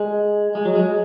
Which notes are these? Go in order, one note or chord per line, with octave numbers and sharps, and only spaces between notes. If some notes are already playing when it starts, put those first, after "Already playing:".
Already playing: G#3
G#3
F#3
G#3